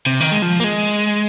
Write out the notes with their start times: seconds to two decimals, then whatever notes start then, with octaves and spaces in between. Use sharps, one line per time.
0.06 C3
0.20 D#3
0.32 G#3
0.42 F3
0.60 A#3
0.64 G#3